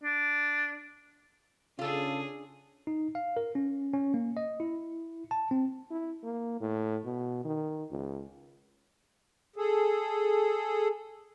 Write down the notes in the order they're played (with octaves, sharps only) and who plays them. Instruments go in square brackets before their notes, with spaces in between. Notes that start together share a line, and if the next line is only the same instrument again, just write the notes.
[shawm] D4
[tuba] C#3 [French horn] C#4 [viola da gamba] D4 G#4 [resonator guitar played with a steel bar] F4 A4
[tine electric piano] D#4
F5
A#4
C#4
C#4
A#3
D#5
E4
A5
C4
[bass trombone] E4
A#3
A2
B2
D#3
C#2
[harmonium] G#4 A4